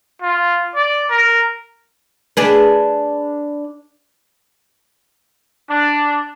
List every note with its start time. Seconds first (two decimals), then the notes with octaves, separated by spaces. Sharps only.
0.22 F4
0.75 D5
1.10 A#4
2.37 D4 G#4 B4
5.69 D4